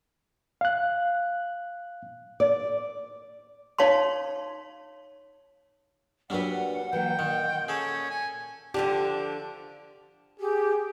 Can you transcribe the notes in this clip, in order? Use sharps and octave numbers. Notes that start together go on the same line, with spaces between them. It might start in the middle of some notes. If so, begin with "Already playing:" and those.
F5 F#6
D5
D#4 C#5 F5 A5 C6
A#2 F#3 G3 D4 B4 F#5
E3 F#3 A#3 G5
A#2 D#3
C#4 G#4 A4
G#5
D3 F3 D4 G4
G4 G#4